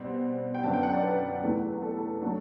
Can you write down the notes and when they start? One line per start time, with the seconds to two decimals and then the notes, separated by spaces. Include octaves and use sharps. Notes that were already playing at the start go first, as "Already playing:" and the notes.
Already playing: B2 G3 C4
0.55 G5
0.63 F#2 D3 F#3 B3 A5
0.74 G5
0.83 F#5
0.93 D5
1.03 B4
1.43 E2 C3 E3 A3
1.82 A4
2.22 F#3 A3 D4